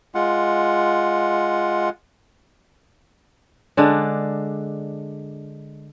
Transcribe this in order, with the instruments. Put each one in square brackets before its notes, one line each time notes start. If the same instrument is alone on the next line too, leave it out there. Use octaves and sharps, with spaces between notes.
[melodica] G#3 F4 F#5
[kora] D3 G#3 D4